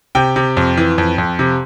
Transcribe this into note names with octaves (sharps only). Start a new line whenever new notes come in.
C3 G5
C3
F2
E3
F2
F2
C3